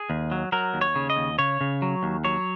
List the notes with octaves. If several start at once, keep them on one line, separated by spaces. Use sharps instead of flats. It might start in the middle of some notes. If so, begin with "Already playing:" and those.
Already playing: G#4
D#2
F#3
F#3 A#4
D#2
C#5
C#3
D#5
D#2
C#3 C#5
C#3
F#3
D#2
F#3 C#5